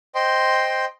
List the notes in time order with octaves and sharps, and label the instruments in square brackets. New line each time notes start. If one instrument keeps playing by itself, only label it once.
[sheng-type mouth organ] C5 D#5 G5 C6